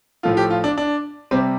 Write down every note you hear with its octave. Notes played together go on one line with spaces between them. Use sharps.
A2 F3 A3 F4
G4
F4
D4
D4
C3 G3 C4